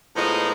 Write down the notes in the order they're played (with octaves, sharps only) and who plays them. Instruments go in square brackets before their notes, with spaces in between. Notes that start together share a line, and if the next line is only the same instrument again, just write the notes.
[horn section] A2 F3 G#3 B3 D#4